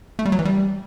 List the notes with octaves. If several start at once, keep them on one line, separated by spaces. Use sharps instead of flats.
A3
G3
F#3
E3
G3